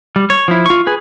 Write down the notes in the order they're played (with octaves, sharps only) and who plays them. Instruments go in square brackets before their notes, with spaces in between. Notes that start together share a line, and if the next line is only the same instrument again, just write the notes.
[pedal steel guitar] G3
C#5
F3 E4
F4 C#6
G#4 B4